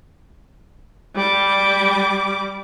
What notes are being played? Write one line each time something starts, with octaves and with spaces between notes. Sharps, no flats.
G3 D6